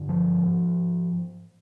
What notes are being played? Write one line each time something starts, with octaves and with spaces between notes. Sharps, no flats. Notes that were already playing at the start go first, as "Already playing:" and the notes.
Already playing: G2 D3
F3
G#2